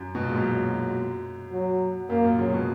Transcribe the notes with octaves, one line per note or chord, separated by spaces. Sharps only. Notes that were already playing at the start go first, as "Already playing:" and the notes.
Already playing: F#2
B2
A#2
G#2
F#2 F#3
F#3
F#2 A#3
A#2
C#3 F#3
B2